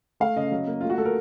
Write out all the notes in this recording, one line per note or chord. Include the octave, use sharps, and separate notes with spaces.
A3 F5
C#3 D#5
F#3
A#3
A3 F4
F#4
A3 A4
A#4